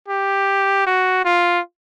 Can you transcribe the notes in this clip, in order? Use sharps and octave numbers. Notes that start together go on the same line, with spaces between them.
G4
F#4
F4